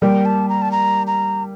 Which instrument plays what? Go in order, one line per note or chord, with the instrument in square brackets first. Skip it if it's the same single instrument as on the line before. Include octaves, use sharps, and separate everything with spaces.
[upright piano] G3 A#3 [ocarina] G5
[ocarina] A5
A#5
A5
A#5
A#5